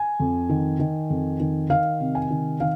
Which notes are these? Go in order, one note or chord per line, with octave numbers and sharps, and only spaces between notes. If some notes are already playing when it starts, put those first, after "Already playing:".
Already playing: G#5
F2
D#3
D#3
F2
D#3
D#3 F5
C3
G#5
D#3
D#3 F5